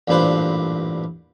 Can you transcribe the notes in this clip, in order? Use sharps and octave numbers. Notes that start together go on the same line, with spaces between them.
A1 G2 A#2 D4 B4 C5